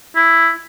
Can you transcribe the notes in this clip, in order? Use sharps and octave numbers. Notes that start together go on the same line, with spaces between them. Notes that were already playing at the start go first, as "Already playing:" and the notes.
E4